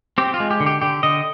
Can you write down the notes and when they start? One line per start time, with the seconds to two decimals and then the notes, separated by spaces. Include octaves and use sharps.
0.18 C4 G4
0.34 F4
0.40 G#3
0.51 G4
0.60 D3
0.66 G4
0.82 D3 G4
1.03 D3 D#5